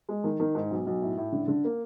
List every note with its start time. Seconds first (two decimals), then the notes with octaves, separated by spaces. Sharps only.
0.09 G#3
0.24 D#3
0.40 D#3
0.55 G#2
0.71 B1
0.86 B1
1.02 A2
1.17 A2
1.32 D3
1.48 D3
1.64 A#3